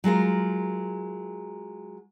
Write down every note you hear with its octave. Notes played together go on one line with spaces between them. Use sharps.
F#3 G#3 F4 A#4